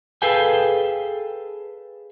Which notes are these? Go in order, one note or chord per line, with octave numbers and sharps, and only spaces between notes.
G#4 A4 B4 F5 G5 G#5